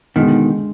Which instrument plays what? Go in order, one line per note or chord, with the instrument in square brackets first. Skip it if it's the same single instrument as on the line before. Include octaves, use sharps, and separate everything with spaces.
[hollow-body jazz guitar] B2 D#3 [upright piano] D3 G#3 D#4